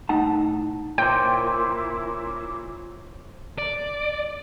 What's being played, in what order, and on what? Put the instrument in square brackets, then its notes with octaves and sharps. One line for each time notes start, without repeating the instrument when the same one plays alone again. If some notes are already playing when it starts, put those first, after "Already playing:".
[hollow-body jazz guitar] A2 D#4 F#5 A5
[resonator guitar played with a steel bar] A#2 [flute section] E4 D6 [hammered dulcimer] C5 C#5 [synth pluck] G5
[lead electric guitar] D5